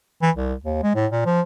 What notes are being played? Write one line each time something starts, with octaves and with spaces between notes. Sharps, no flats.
E3
C2
D#2
G#3
A2
A#2
F3